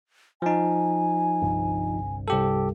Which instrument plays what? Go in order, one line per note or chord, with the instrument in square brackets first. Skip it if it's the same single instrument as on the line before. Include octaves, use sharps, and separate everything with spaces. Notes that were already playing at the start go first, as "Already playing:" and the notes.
[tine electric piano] F3 D#4 [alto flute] G#5
[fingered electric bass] G1 C2 G2
[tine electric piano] C2 G4 A4 [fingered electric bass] G2